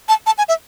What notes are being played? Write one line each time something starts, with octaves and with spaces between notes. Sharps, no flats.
A5
A5
G#5
E5